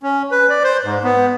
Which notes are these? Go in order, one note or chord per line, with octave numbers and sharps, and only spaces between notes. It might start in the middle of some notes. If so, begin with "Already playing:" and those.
C#4
B4
D5
C5
G#2
B3